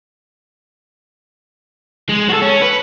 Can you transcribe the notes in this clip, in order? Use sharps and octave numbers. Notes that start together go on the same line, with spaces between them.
G#3
F#4 A4
C#4
B4